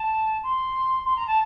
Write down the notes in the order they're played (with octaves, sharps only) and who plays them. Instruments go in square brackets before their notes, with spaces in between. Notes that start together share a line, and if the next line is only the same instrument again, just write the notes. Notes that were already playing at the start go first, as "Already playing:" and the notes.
Already playing: [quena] A5
C6
C6
A#5
A5